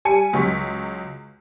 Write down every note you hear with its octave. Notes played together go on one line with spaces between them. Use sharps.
G3 G#5 C#7
C#2 F#3 C#6 B6